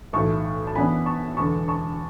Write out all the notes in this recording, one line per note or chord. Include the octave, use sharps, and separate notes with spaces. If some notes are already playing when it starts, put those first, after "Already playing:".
B1 A2 E3 A5 C#6
A5
F#2 E3 B3 D4 G#5 B5
A5 C#6
E1 E2 D3 A5 C#6
A5 C#6